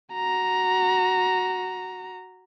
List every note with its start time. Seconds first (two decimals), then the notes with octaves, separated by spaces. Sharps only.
0.13 F#4 A#5